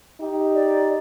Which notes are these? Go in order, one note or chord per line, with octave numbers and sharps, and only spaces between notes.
D#4 G4
D5